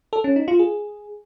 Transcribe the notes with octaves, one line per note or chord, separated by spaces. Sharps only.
A4
C#4
D#4
F4
G#4